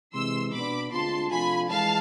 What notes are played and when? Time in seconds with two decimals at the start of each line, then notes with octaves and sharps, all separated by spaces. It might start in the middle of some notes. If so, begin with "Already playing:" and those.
0.13 C3 E3 G#3 C6 E6
0.53 B2 B3 D4 B5 D6
0.91 D2 D3 G#3 C4 F4 A5 C6
1.30 C3 F3 A3 D4 F4 G#5 B5
1.69 E3 G#3 F5 A5